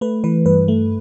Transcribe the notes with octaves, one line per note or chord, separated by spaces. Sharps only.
A3 B4
E3 B4
G2 B4
A3